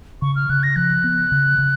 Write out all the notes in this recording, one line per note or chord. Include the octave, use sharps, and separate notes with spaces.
C#3 C#6
F6
C#3 F#6
A#6
F3 F#6
B3
C#3
C#3